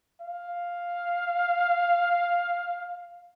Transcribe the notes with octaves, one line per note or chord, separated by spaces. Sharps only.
F5